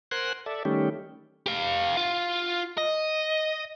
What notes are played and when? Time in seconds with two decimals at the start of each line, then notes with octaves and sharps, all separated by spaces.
0.11 A#4 C5 F#5 G#5 C6 F#6
0.46 A4 D5 E5
0.65 D#3 G3 A3 C#4 G4
1.46 G4 F5
1.97 F4
2.78 D#5